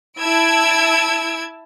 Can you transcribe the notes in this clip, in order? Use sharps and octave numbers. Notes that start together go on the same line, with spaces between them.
E4 A5 E6 G#6 D7